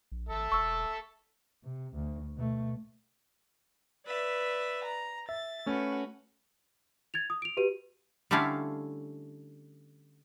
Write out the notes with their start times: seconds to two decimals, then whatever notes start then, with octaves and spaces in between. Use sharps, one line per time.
0.12 A#1
0.29 G#1 A4 E5
0.52 E1 C#6 E6
1.63 C3
1.94 D2
2.36 B2 A3
4.07 B4 D5 E5
4.84 A#5
5.29 E5 A6
5.66 A3 C#4 F#4 B4
7.14 G#6 A6 F7
7.30 D#6
7.42 D7 F7
7.57 F#4 G4 B4 D#7
8.31 D3 G3 A3 C#4 E4 F5